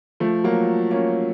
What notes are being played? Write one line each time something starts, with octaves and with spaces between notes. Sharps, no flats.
F3 A3
F#3 A#3
A#3 C#4